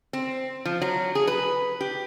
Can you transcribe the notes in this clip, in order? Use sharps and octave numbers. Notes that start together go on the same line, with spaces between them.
C4
F3
F#3
G#4
B4
G4